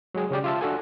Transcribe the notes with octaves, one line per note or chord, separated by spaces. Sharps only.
F#3 G#3 G#4
C#3 C#4 G4 D5
F4 E5 A5
D4 F#4 A4 G#5